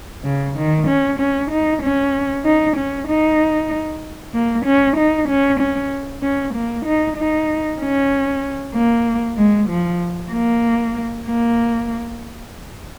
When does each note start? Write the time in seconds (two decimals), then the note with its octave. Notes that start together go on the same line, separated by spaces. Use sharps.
0.24 C#3
0.56 D#3
0.88 C#4
1.19 C#4
1.51 D#4
1.83 C#4
2.45 D#4
2.77 C#4
3.08 D#4
4.34 A#3
4.66 C#4
4.97 D#4
5.29 C#4
5.60 C#4
6.23 C#4
6.54 A#3
6.86 D#4
7.17 D#4
7.80 C#4
8.74 A#3
9.37 G#3
9.69 F3
10.32 A#3
11.26 A#3